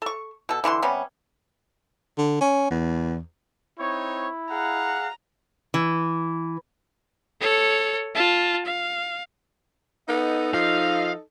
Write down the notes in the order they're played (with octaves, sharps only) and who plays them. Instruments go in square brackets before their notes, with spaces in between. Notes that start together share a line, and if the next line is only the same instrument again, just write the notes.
[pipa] A4 C#6
B2 A4
D3 E3 F5 C6
C3 G3 B3 C#4
[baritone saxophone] D3
C#4
E2
[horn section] C4 D#4 C#5 [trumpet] E4
[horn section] G#4 F5 F#5 [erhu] A#5
[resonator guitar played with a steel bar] E3
[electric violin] A4 C#5
F4 A5
F5
[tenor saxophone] B3 [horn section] D#4 A4 D#5
[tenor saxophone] F3 [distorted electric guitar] F5